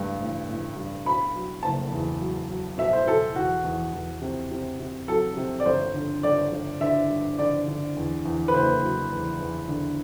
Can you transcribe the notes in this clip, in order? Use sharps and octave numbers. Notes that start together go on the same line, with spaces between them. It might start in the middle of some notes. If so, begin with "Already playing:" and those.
Already playing: G2 A3
A1
A1
G2
B2 B5
F#3
F#1 A5
E2
F#3
F#3
B2 E5
C5
B2 A4
E2 F#4
E2
E2
C3
C3
C3
F#3 A4
C3
D5
G1 C5
D3
G1 D5
G1
D3 E5
G2
D3 D5
D3
E2
E2
B4
F#1 C5
F#3
E2
E2
D3